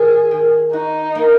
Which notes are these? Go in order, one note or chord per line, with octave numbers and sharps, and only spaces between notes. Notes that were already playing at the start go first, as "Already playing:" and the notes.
Already playing: D#3 G#4
D#3
D#4 F#4
A#3